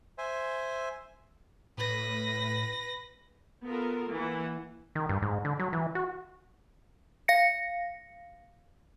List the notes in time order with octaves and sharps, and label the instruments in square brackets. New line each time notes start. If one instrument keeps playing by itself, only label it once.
[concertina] C5 E5 G#5
[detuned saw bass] A2 [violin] B4 A#6
[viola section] B3 F4 A4 A#4
E3 A#3 F#5
[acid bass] D#3
G2
G#2
D3
F#3
E3
F#4
[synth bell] F5 A#6 C#7